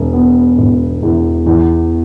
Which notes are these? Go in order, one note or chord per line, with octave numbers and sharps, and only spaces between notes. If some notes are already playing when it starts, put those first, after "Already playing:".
Already playing: E1
B3
E1
E2
E2